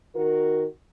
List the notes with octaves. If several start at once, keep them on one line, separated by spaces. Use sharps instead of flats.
D#3 F#4 A#4